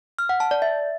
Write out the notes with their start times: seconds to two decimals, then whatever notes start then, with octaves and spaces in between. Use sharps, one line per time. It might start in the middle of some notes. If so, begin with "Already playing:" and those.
0.19 F6
0.29 F#5
0.40 A5
0.51 D5
0.62 E5